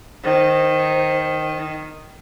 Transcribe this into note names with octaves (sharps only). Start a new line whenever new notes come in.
D#3 C5